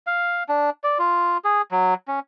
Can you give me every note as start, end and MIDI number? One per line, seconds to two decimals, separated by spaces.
0.07 0.43 77
0.49 0.70 62
0.84 0.98 74
0.99 1.37 65
1.45 1.62 68
1.72 1.94 54
2.08 2.20 61